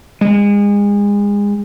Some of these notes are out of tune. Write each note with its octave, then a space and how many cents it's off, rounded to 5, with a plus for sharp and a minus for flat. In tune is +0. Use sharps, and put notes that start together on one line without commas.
G#3 -30